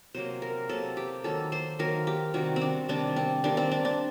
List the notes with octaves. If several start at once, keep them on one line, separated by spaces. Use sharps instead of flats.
C3 F#3 A#3 C5
A#4
C3 F#3 A#3 A4
G4
D#3 F#3 A#3 A4
C5
D#3 F#3 A#3 A#4
G4
C3 D#3 G3 F#4
C4
D4
C3 D#3 G3 D4
C4
D#3 G3 A#3 D4
C4
D4
D4